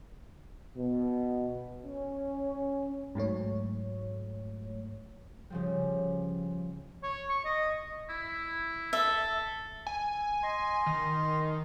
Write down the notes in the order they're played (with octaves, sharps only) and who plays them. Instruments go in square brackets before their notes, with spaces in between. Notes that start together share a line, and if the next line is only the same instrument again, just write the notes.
[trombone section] B2
C#4
[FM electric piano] G#2 F#3 A3 C#5
[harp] C#3 F3 G3
[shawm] C#5
C#6
D#5
[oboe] E4
[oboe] A4 [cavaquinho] E5
[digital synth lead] G#5
[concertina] D#5 C6
[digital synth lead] D#3